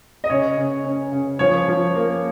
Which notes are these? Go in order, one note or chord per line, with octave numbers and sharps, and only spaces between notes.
D#5
C#3 C#5
C#3
C#4
C#3
F3 C#5
F3
A#3